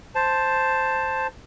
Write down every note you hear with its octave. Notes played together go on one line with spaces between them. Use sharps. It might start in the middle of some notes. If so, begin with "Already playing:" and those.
C5 A5